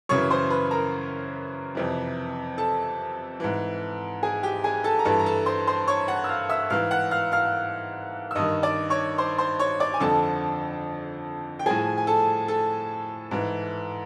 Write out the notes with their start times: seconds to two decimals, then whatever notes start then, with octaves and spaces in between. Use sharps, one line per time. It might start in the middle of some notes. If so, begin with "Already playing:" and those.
0.09 F#2 C#3 E3 C#5 C#6
0.30 C5 C6
0.50 B4 B5
0.71 A#4 A#5
1.75 F2 C3 E3
2.58 A4 A5
3.40 G#2 E3
4.23 G#4 G#5
4.43 G4 G5
4.64 G#4 G#5
4.84 A4 A5
4.99 A#5
5.05 G2 E3 A4 A5
5.20 A#5
5.26 A4 A5
5.46 C5 C6
5.67 C5 C6
5.87 C#5 C#6
6.08 F#5 F#6
6.24 E6
6.29 F5 F6
6.49 E5 E6
6.70 G#2 E3 F5 F6
6.91 F#5 F#6
7.11 F5 F6
7.32 F5 F6
8.31 E6
8.35 G2 D#3 D#5 D#6
8.63 D5 D6
8.90 C#5 C#6
9.18 C5 C6
9.38 C5 C6
9.59 C#5 C#6
9.80 D5 D6
9.94 G#5
10.00 F2 D3 F3 A4 A5
11.59 G5
11.66 A2 F3 G#4 G#5
11.98 G#5
12.07 A4 A5
12.48 A4 A5
13.31 G#2 E3